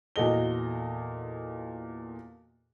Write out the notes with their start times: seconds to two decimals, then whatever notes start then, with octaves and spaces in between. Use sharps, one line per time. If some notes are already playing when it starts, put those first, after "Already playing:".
0.16 E2 A#2 F#4 A4 D#5 G7